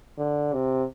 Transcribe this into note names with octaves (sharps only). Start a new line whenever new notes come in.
D3
C3